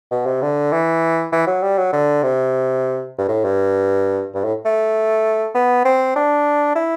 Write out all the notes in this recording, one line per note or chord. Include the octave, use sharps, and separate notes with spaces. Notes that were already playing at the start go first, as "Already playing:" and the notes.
B2
C3
D3
E3
E3
F#3
G3
F#3
D3
C3
G2
A2
G2
G2
A2
A3
B3
C4
D4
E4